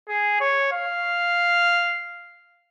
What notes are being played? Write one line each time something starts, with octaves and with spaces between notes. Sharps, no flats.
G#4
C#5
F5